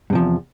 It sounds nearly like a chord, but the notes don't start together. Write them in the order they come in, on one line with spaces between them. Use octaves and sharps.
G2 C3 F3 E2